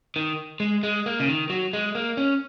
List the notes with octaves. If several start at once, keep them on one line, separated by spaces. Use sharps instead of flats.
D#3
G#3
G#3
A#3
C#3
D#3
F#3
G#3
A#3
C#4